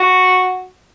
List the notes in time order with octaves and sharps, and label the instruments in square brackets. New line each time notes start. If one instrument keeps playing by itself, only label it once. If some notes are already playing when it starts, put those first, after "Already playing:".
Already playing: [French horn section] F#4